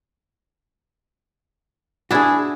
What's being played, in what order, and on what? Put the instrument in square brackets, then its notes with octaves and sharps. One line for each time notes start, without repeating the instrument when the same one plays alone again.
[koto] D4 E4 [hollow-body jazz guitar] F#4 G#4